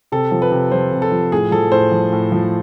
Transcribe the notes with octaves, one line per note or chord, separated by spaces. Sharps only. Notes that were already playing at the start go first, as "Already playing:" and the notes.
C3 A4
F3
B4
C3
F3 C5
C3
A4
F3
A2 G#4
F3 A4
A2 C5
F3
A2
F3